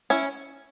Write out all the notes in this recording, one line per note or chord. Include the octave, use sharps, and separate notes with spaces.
C#4 E4